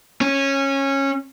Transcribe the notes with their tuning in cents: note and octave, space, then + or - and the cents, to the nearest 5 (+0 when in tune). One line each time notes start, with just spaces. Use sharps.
C#4 -15